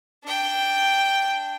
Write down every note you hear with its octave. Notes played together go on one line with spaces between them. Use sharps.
D4 G5